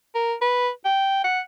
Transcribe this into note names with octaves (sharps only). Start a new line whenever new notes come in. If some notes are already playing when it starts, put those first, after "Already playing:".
A#4
B4
G5
F#5